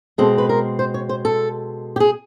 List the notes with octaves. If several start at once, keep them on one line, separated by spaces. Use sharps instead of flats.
B2 G#3 C4 A4
B4
A#4
C5
C#5
C5
A4
G4
G#4